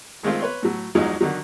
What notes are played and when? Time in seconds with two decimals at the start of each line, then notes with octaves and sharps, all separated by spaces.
0.23 D#3 G#3 A3 C4 F4
0.41 B4 C#5 C6
0.63 A2 F#3
0.95 A1 E2 F3 F#3 G#3 D#4
1.21 D3 D#3 F#3